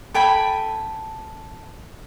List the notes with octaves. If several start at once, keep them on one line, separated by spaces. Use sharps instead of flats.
A4 G5 G#5 B5